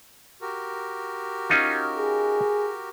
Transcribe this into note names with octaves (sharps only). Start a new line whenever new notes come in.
F#4 G4 A#4
C#4 D#4 F4
G#4